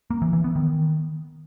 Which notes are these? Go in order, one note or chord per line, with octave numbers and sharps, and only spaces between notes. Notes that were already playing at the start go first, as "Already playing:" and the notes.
A#3
E3
E3
B3
D#3